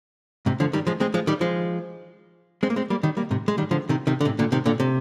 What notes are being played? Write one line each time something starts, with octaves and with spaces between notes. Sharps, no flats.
G#2 C3
D3 F3
D#3 G3
F3 G#3
G#3 C4
F3 G#3
D#3 G3
F3 G#3
G#3 C4
A#3
G#3 C4
G3 A#3
D#3 G3
G3 A#3
G#2 C3
G#3
D#3 G3
D3 F3
C3 D#3
C3 D#3
D3
G#2 C3
A#2 D3
C3 D#3
A#2 D3
C3